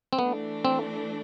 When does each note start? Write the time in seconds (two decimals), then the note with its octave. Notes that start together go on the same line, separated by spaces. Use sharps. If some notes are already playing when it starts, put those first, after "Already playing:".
0.13 C4
0.18 E3 A3 B3 D4
0.65 C4